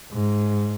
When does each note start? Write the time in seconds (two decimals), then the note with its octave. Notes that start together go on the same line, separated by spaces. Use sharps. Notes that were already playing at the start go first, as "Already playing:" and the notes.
0.13 G#2